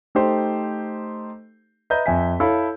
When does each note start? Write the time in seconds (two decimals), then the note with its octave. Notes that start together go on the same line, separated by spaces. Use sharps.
0.15 A3 D#4 G4 C5
1.90 B4 D#5 E5 A#5 G6
2.06 F2 E5 G#5 B6
2.40 E4 A4 C#5 F5 B5